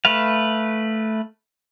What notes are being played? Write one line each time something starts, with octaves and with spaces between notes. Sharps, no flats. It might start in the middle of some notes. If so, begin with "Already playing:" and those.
A3 B4 F5